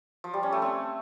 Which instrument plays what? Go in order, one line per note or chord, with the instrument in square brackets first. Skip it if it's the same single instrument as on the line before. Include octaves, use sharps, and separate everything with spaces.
[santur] F3
G3
C#4
A3
C4